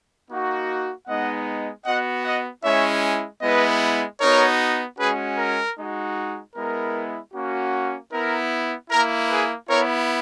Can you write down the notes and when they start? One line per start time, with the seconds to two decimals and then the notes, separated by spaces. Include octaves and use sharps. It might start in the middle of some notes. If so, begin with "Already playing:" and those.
0.29 A#3 D#4 F#4
1.07 G#3 B3 D#4 D#5 F#5
1.86 B3 F#4 D#5 F#5
2.24 D#5 F#5
2.63 G#3 C#4 E4 C#5 E5
3.42 G#3 B3 E4 B4 D#5
4.20 B3 D#4 F#4 A#4 C#5
4.98 G#3 C#4 F#4 G#4 B4
5.38 A#4
5.78 G#3 D#4 F#4
6.55 G#3 B3 E4 A#4
7.34 A#3 C#4 F#4
8.12 B3 E4 A#4
8.91 A#3 E4 A#4
9.30 G#4 B4
9.69 B3 E4 A#4 C#5